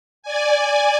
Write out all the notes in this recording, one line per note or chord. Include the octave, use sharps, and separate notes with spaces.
D5 G#5